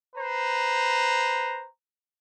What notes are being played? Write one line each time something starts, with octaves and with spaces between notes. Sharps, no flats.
B4 C5 A#5